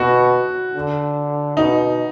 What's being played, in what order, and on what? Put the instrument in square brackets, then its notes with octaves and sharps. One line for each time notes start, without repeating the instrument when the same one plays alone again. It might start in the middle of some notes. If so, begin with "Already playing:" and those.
Already playing: [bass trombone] B2 [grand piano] F#4
[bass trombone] D3
[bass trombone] B2 [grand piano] D#4